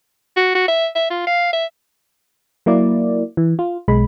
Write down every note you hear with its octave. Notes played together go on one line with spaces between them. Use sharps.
F#4
F#4
E5
E5
F4
F5
E5
F#3 A#3 E4 D5
E3
F4
B1 G#3 B5